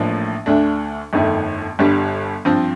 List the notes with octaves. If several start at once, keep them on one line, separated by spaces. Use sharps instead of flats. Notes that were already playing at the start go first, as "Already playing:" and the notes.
Already playing: A1 A2 F3 A#3 D4
D2 D3 A3 D4
G1 F2 D#3 A3
G1 G2 D3 G3
G2 F3 C4